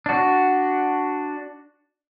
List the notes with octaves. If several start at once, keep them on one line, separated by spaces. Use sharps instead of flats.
D4 F#4